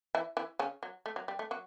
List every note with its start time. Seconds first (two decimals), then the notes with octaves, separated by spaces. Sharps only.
0.15 E3 E4
0.37 E3 E4
0.59 C#3 C#4
0.83 F#3
1.06 A3
1.16 F#3
1.28 G3
1.39 A3
1.51 F#3 F#4